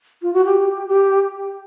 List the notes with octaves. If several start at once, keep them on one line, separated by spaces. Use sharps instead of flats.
F4
F#4
G4
G4